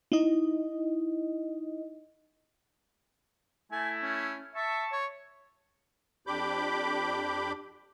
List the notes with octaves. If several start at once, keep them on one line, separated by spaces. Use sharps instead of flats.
D#4 E4 D#5
A3 E4 G#5
C#4
E5 A5 C#6
C#5
F2 D4 G4 B5 D6 G6